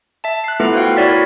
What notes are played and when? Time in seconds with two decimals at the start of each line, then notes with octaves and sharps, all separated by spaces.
0.24 E5 A5
0.44 F#6 C7
0.60 A3 B3 E4 F4 A4 B4
0.74 F#4 C5 F5 G5
0.97 E4 F#4 C#5 D5 A6 B6
1.09 A#4